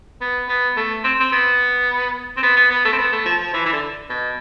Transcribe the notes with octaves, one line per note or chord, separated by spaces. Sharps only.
B3
B3
A3
C4
C4
B3
C4
B3
B3
B3
A3
C4
B3
A3
F3
F3
E3
E3
D3
B2